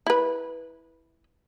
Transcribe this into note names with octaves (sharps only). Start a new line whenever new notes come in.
E4 B4